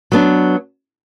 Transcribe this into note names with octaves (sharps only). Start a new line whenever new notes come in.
F#3 B3 D4